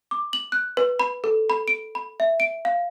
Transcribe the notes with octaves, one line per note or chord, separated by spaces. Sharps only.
D6
F#7
F#6
B4
B5
A4
B5
D7
B5
E5
D7
F5